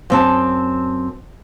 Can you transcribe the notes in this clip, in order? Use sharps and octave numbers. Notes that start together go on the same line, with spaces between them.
F#2 C4 A5